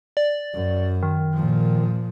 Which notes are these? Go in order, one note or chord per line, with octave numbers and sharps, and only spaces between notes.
D5
F#2
D#3
A#2 F3